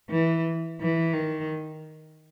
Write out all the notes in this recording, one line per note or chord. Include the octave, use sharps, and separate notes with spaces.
E3
E3
D#3